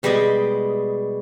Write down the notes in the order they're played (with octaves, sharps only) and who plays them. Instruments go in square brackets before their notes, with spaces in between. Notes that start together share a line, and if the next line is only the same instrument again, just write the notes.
[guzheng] B2 G3 G#3 D5 D#5